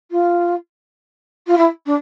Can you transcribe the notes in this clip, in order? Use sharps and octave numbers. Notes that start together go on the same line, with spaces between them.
F4
F4
E4
D4